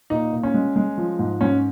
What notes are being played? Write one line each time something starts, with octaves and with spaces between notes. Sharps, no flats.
A#2 D#4
A#2
C#4
G#3
G#3
F3
G#2
G#2 C#4